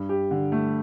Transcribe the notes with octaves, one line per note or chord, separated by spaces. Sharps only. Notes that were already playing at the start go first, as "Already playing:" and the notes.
Already playing: G2
G4
D3
A3